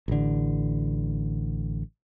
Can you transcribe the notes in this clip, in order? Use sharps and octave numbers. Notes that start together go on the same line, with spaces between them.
A1 D3